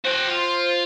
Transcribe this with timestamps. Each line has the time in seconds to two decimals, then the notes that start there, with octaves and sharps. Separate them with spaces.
0.05 F#4 C5 G5
0.28 F4